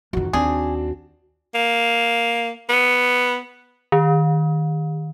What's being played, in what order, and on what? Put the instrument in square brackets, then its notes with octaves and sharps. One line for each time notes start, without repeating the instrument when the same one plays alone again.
[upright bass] F2 D#3 [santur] F#4
[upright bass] D#2 [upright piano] C4 D4 [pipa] G#4
[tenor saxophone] A#3
B3
[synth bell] D#3